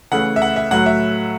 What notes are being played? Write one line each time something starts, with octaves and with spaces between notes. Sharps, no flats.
C#3 E3 A3 F#5
E5
F#5
E5
A2 F#3 A3 F#5
E5